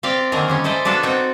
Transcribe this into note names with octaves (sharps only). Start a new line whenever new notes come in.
C4 G4 D5 F5
D3 D#3 F#3 A#3 G#4 A#4
G3 G#3 C#4
E4 A4 C5 D5 D#5
B3 D4 F4 F#4 A4 D5
C4 D#4 F#4 G5